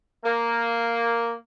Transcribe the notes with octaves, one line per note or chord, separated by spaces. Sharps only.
A#3